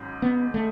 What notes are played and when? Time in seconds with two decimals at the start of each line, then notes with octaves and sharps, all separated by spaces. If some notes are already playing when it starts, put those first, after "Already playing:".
Already playing: G#1 G#2 F#3 C#4
0.22 B3
0.54 A3